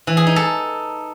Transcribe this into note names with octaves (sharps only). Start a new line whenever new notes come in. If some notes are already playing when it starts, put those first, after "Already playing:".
E3
G#4
D#4
A4